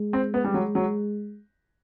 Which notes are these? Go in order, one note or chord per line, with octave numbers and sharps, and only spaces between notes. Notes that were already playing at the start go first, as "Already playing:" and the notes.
Already playing: G#3
C4
B3
G3
F#3
F#3